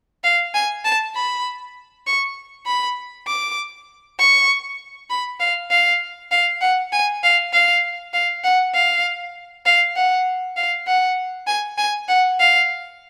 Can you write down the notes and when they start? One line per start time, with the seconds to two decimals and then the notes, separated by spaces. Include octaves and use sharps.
0.24 F5
0.55 G#5
0.85 A5
1.15 B5
2.07 C#6
2.67 B5
3.27 D6
4.19 C#6
5.10 B5
5.40 F5
5.71 F5
6.31 F5
6.61 F#5
6.93 G#5
7.23 F5
7.53 F5
8.14 F5
8.44 F#5
8.74 F5
9.66 F5
9.96 F#5
10.57 F5
10.87 F#5
11.47 G#5
11.78 G#5
12.09 F#5
12.39 F5